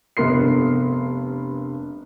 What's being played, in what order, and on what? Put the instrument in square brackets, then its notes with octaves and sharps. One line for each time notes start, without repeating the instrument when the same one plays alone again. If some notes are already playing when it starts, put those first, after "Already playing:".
[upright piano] F1 G2 B3 A#4 C6 C7